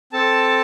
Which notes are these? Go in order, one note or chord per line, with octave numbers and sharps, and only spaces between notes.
C4 A4 A5